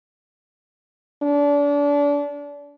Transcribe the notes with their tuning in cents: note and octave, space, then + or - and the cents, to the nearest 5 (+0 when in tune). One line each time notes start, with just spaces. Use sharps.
D4 -30